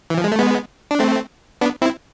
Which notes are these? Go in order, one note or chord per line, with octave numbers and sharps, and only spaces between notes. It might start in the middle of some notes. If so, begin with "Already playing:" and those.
E3
F3
G#3
A3
G#3 B3
D4
A3 C4
B3 D4
C4 E4